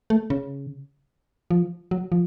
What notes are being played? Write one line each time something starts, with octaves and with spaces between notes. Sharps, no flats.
A3
C#3
F3
F#3
F3